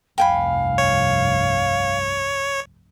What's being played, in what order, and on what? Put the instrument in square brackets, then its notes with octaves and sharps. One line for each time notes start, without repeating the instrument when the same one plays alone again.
[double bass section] F1 C2 G2 [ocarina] F5 [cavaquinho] G5 G#5 B5
[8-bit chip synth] C#5